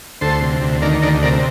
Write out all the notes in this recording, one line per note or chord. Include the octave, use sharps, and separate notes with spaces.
D2 A4 C5
C3
D2
D#3 A#4 D5
D2 A#4 D5
C3 A#4 D5